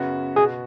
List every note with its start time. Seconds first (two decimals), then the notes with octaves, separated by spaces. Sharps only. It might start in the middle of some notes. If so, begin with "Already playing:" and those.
Already playing: F#2 C#3 B3 F#4
0.36 B2 B3 F#4 G#4